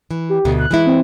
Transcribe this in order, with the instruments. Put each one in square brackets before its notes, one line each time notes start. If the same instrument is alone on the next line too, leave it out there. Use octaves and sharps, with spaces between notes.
[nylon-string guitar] E3
[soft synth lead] G4
[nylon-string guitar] D2 B2
[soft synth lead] F#6
[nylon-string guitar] E3 G#3 E4
[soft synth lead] C4